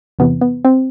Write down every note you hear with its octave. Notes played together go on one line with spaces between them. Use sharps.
E2 C3 E3 B3
B3
C4